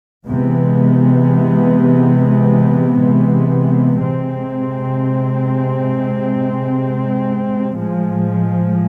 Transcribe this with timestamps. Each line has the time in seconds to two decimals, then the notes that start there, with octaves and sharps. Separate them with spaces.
0.25 C3 E3 G#3 B3
3.99 C3 G#3 C4
7.75 A2 F3 G#3